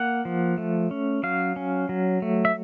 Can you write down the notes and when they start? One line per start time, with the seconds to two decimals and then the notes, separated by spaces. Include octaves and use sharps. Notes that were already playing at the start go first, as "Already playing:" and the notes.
Already playing: A#3 F#5
0.25 F3
0.58 A3
0.91 C#4
1.23 F#3 F5
1.56 C#4
1.89 F#3
2.22 A3
2.45 E5